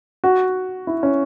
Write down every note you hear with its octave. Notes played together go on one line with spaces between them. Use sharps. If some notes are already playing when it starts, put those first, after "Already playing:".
F#4
E4
C#4